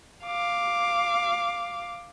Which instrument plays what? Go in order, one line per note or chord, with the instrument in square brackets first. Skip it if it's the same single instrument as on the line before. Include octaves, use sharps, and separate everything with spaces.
[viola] F5 D6